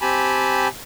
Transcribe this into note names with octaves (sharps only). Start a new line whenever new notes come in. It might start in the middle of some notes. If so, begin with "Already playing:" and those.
C4 G4 G#5 A5 B5